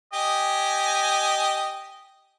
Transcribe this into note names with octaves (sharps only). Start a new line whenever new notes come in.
G4 D#5 G#5